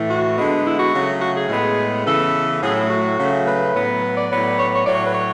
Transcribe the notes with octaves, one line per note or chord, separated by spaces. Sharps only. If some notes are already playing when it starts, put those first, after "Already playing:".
Already playing: A2 E3 A3
F#4
D3 G#3 B3
E4
F#4
C#3 F#3 A3
F#4
G#4
A2 G#3 B3
C#3 E3 B3 A4
A2 F#3 A3 G#4
E4
F#4
C#3 F#3 A3
B4
A2 F#3 B3
B4
D5
A2 F#3 B3
C#5
C#5
A2 F#3 A3 D5
C#5
B4
C#5